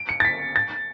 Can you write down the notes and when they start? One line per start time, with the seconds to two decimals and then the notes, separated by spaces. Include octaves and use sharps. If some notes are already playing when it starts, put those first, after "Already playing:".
Already playing: D7
0.09 C#7
0.20 A6
0.25 B6
0.56 A6